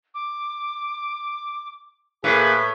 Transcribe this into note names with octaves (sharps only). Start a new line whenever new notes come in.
D6
A2 A#3 G#4 B4 B6